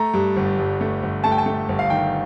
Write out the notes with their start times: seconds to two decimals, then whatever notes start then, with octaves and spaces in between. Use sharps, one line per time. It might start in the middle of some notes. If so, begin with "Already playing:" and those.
Already playing: A3 A#5
0.14 G2
0.36 G1
0.58 G2
0.81 A3
1.03 G1
1.24 A3 A5
1.32 G5
1.38 A5
1.46 A3
1.69 G1
1.79 F5
1.90 D#3 G5